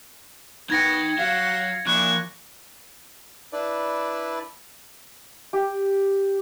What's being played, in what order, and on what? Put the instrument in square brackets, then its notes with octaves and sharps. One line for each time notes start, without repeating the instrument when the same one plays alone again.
[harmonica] B3 F#4 [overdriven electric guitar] D#4 G5 [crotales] G#6 A#6 C#7
[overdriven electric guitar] F#3 F#4 [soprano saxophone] F5 [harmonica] F#5
[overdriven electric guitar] F3 A#3 [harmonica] D4 E4 [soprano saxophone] C#6 [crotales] F#6
[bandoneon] D4 E4 B4 D5
[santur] G4